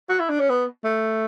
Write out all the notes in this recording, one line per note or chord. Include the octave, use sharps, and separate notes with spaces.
F#4
E4
D4
C#4
B3
A3